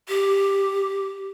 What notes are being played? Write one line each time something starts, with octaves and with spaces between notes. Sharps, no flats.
G4